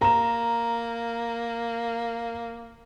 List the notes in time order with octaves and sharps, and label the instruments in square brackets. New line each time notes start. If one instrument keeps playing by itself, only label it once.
[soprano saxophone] A#3 [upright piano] A#5 E7